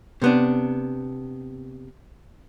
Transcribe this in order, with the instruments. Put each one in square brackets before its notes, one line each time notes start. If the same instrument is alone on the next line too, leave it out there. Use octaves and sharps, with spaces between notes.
[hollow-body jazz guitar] C3 B3 D4